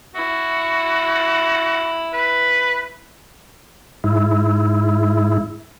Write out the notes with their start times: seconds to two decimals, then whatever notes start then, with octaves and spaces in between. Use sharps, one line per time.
0.15 E4 F#4
2.13 B4
4.04 G#2 E4